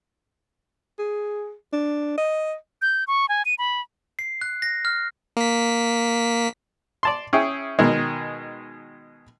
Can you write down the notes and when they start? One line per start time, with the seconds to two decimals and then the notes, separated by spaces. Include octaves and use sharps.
0.99 G#4
1.73 D4
2.17 D#5
2.82 G6
3.07 C#6
3.29 G#5
3.45 D#7
3.59 B5
4.19 C7
4.41 F#6
4.62 A#6
4.85 F6
5.37 A#3 B6
7.03 D5 A5 C6
7.33 C#4 E4 G#4 G5
7.79 B2 D#3 G#3